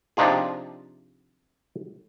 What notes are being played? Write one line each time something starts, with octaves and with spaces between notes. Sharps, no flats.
C3 F3 D4 D#4 F4 G#4